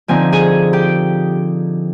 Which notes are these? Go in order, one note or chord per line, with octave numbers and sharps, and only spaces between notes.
D3 F3 C4 D#4 G#5
G#4 G#5
G4 G5